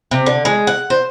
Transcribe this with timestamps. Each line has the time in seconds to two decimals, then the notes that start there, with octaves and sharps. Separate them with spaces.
0.11 C3
0.26 D3
0.45 G#3
0.67 F#5
0.90 C5